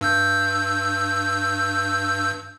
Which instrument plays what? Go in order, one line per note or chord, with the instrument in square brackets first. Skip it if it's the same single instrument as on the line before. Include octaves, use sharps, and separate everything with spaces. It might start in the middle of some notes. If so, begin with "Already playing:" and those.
[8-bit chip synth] G2 E6 G6